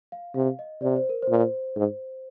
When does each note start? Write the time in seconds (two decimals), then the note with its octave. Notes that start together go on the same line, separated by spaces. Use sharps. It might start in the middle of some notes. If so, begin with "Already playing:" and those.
0.12 F5
0.35 C3 F5
0.59 D#5
0.82 C3 D5
0.96 C5
1.09 A#4
1.22 C5
1.30 A#2
1.77 G#2